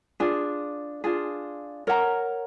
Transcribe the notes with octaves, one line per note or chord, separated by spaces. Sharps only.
D4 F4 G#4
D4 F4 G#4
A#4 C#5 F#5 A#5